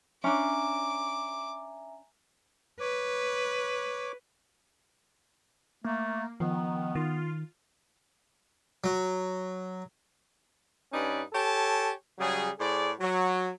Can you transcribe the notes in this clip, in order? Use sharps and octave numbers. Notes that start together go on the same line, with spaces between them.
C#4 D4 E5 G#5 A#5 D6
B4 C#5 D6
A3 A#3
D#3 F3 B3
D#3 F4
F#3
G2 C#4 D#4 B4 D5
G4 A4 C#5 G#5 A5
C#3 F#3 G3 G#4
A2 G#4 C5 D5
F#3